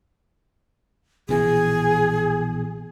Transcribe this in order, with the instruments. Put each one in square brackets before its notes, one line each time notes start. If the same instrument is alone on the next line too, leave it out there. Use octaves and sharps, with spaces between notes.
[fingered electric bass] A#1 B2 E3 [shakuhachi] G#4